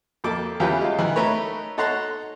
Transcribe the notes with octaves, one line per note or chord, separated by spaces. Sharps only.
F2 A#3 A4 D6
E2 E3 C#4 F4 G4 B4
G#3 F4
D#3 E3
A3 D#4 A#4 B4 C#5
D#4 A4 C#5 F#5 A#5 C6